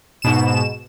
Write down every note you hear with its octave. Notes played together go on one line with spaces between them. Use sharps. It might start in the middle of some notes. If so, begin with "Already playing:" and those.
G#2 B2 E7